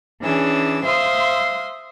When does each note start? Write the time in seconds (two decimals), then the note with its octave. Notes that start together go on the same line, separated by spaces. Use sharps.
0.22 E3 C#4 D4 G#4 E6
0.84 C5 E5 F5 C6 D#6